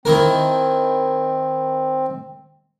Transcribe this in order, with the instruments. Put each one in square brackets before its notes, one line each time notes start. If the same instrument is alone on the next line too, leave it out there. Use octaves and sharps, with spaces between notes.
[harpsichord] D#3 E4 A#4 [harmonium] C4